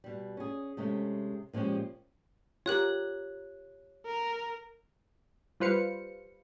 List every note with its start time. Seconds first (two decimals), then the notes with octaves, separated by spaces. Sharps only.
0.04 B2 G3
0.37 C#4 G#4
0.77 C3 G#3 A3 C#4
1.53 A#2 F3 G#3 C#4 G4
2.66 F4 G4 A#4 C#5 F#6 F#7
4.06 A#4
5.60 G3 F4 B4 C5 F5 C#7